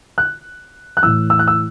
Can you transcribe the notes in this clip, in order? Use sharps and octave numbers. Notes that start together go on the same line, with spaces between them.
F#6
F#6
A2 E3 E6
E6
F#6
E6